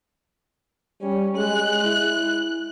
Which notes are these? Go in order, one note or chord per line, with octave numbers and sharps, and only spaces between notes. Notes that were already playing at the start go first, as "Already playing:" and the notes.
G3 C#4
G#3 F#6
E4